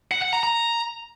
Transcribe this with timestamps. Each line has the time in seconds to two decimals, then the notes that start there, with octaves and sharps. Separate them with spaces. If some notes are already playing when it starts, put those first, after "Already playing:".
0.12 F#5
0.22 F#5
0.33 A#5
0.43 A#5